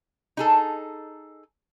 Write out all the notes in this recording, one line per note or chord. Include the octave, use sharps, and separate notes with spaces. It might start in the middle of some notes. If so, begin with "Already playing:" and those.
D#4 G#4 A4